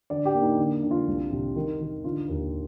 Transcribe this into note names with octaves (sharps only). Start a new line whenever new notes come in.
D3 D5
G4
A#3
D#4
D3
D3
F4
C2
C3
D#3
D#3
D3 F4
D#2